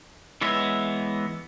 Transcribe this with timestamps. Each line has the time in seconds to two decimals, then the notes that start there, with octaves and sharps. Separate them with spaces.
0.41 E3 G#3 B3 C#5 E5